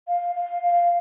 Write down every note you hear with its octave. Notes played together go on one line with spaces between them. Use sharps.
F5
F5
F5